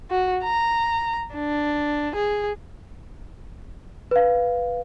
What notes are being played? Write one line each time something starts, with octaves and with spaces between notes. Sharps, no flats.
F#4
A#5
D4
G#4
B4 F5